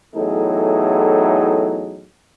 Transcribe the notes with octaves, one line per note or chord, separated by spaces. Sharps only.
E2 A2 F#3 D#4 G#4 A4